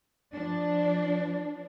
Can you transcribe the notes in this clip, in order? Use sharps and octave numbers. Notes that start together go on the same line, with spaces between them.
F3 D4